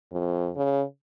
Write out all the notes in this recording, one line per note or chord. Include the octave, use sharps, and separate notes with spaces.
F2
C#3